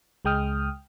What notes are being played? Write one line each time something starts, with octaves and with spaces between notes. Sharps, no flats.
C#2 G#3 G5 D#6 F6